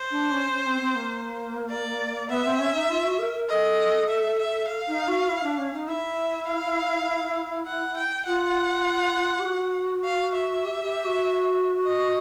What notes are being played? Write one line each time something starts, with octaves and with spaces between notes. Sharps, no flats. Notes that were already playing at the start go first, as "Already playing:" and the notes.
Already playing: C5
D4
C#4
C#4
C4
C4
A#3
D5
B3 E5
C4
C#4
D#4
F4
F#4
A#4
A#4
A4 D#5
E5
E5
F5
D#4
F#4
E4
D4
C#4
D#4
E4 E5
F5
F#5
G5
F4 F#5
G4
F#4
F5
E5
G4
G4
F#4
D#5